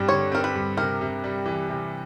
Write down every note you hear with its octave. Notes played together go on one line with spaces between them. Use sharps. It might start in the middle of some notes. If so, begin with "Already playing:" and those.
Already playing: G2 G3 C4
D3 C#5
C4 A#4
B4
G2
C3 A#4
C3
G3
E3
C3